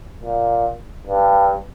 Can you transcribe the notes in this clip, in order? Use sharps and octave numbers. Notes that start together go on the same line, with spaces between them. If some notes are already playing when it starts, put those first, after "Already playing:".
A#2
G2